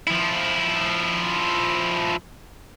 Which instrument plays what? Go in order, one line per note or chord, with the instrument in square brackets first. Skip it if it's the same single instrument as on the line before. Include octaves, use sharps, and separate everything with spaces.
[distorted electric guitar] F3 E4